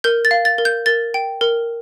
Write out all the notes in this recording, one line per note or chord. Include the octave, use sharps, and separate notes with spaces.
A#4 G6
A6
F5
A6
A#4
G6
A#4 A6
G5
A#4